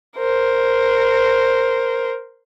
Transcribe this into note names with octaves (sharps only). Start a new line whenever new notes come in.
A#4 C5